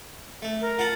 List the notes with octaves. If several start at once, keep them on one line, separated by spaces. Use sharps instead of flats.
A3
A#4
F4 F#5 A5